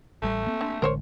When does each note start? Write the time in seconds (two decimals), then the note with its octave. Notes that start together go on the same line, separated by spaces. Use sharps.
0.22 A1 G3 A3
0.47 A#3 C4
0.61 D3
0.82 A1 D3 G#3 A#4 C5 C#5